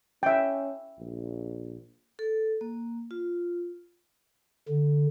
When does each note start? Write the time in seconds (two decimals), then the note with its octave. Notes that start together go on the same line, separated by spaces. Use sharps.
0.23 C#4 E5 G5
0.98 A#1
2.19 A4
2.61 A#3
3.11 F4
4.68 D3